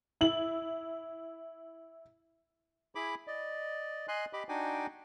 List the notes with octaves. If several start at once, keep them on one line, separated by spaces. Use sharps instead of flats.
E4 F#7
E4 G#4 B5 D6
D5 D#5
D#5 G#5 C6 F#6
G4 D#5 B5 D6
D4 D#4 F#4 G5 G#5 D6